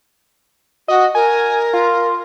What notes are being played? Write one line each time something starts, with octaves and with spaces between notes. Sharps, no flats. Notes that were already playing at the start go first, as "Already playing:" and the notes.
F#4 D#5
A#4 G#5
F4